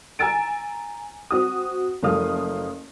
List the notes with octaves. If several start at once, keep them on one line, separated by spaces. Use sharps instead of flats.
G#5 A#5 E6 A6 D7
C4 F#4 D#6
F#1 F3 A3 F5 D#6